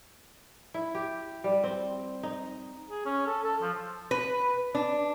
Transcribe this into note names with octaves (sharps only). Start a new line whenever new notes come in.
E4
G4
G3
C4
D#4
G#4
C#4
A4
A4
F3
B4
D4